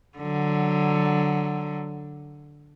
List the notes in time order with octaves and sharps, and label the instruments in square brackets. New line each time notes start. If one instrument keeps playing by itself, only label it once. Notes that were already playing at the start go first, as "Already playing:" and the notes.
[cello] D3 F#3